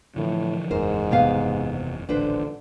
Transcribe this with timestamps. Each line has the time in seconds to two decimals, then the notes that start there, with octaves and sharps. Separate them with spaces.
0.16 A2 D3 E3 F3
0.70 F#1 E2 G#2 A#4 C5
1.11 C3 B3 F5
2.09 D#1 A1 D3 D4 B4 C5